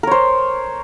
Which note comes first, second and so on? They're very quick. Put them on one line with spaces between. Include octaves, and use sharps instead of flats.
A#4 C#5 C5